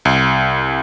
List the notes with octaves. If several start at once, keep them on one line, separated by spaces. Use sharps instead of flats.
C2